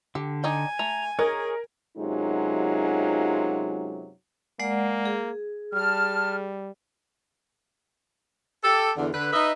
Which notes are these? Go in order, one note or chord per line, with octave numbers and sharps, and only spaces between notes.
D3 G4
D#4 D5 G5 G#5
A3 A#5
D#4 G#4 A#4 C#5
F#2 C3 F#3 G#3 D#4 F4
G#3 A#3 D5 F#5
G#4
G3 A5 F6
G4 A4
E2 D3
D3 B4
D#4 B4 D#5 E5